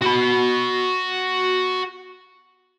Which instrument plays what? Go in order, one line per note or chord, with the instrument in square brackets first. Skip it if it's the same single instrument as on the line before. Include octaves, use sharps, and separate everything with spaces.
[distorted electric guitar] F#4 B5